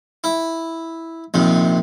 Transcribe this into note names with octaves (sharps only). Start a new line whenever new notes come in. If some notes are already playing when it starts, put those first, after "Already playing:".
E4
A#1 D#2 C3